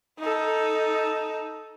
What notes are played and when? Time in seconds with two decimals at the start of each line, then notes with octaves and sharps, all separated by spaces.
0.19 D#4 A4